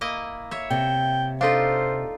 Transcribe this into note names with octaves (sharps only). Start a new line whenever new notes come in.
A#3 E4 D#5
C#5 E5
C3 G5
D4 D#4 F4 A4 C5 F5